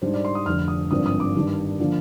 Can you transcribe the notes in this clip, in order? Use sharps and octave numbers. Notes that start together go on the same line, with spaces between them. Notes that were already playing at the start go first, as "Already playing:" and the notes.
G#2 G3 D4 C5
D5
C6
D#6
F1 F2 D3 F6
D#6
G#1 G2 D3 F3 C4 D#6
D#6
D6
G2 D#3 G3 D4
D3 F3 A#3 D4